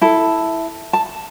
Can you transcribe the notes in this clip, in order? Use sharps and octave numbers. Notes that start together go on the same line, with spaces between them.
E4 A4
A5